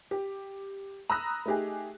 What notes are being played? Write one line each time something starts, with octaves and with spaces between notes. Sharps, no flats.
G4
A#5 B5 D#6 E6 F#6 A#6
A3 D#4 G4 G#4